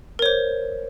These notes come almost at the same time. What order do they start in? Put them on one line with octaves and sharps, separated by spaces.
A#4 C#5 C5